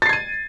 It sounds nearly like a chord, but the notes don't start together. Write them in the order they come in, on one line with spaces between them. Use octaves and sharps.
A6 C7 G#6 D#7